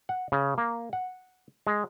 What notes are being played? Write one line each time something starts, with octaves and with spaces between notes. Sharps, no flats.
F#5
C#3
A#3
F#5
G#3